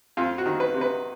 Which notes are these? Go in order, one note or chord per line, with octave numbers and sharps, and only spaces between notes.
F2 F4
F#4
D#3
B4
C3
B4